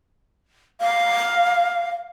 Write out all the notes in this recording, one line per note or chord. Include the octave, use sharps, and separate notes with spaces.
F5